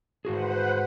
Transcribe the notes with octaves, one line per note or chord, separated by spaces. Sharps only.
G#2 F#4 G#4 B4 C5 F#5